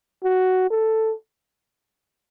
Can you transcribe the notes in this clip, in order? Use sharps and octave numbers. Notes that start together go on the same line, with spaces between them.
F#4
A4